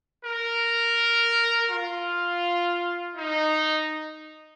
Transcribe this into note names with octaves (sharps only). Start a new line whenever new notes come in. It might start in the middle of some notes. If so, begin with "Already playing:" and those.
A#4
F4
D#4